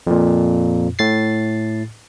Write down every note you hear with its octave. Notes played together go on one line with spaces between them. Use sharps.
F2 A#2
A2 A6 C7